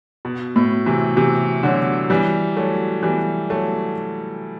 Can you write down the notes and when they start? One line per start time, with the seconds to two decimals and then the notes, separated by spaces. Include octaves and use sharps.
0.25 B2
0.56 A2
0.86 C3 E3
1.17 C3 E3
1.63 D3 F#3
2.10 E3 G3
2.56 F#3 A3
3.03 E3 G3
3.49 F#3 A3